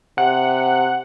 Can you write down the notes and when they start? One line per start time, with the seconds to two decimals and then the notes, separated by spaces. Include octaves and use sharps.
0.18 C3 F#5